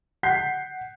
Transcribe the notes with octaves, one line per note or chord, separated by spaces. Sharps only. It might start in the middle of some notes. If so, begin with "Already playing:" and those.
F#5 G6 B6 C7